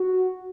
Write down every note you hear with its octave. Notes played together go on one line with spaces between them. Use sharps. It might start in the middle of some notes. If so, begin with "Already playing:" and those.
Already playing: F#4